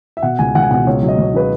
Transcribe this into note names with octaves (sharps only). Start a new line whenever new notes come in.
E5
B2 F#5
C#2 G#5
C#2 F#5
G#5
B2 F#5
C#2 C#5
F#3
D#5
C#2 C#5
C#3 B4